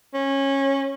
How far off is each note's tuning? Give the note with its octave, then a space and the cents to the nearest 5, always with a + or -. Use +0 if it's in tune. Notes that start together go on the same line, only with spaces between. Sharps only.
C#4 -20